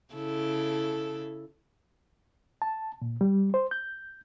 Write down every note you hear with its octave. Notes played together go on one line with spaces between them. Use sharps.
C#3 E4 A4
A5
A#2
G3
C5
G6